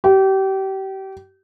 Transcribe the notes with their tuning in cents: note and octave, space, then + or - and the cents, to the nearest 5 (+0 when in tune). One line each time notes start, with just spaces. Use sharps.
G4 -30